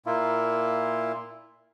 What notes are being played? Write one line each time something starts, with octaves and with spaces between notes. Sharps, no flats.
A#2 A#3 E4 F4